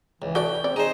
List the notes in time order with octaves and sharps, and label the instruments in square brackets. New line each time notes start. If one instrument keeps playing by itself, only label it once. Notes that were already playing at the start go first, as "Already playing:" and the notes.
[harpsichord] C#2 [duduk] E3
[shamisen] F#4 A4 D5 [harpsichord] G5
[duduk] C4 [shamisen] D5
[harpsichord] D#4 C5 [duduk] G#4